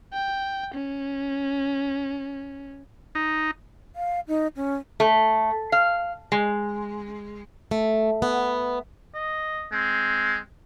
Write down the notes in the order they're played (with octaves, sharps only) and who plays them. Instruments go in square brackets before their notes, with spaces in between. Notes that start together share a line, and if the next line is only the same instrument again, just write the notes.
[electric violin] G5
C#4
[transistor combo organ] D#4
[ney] F5
D#4
C#4
[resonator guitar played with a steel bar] A3
F5
G#3
[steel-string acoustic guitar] A3
B3
[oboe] D#5
[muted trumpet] G#3 [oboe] C4